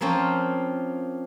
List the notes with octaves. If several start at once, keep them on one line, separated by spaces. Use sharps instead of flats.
F3 A#3 C4 C#4 F4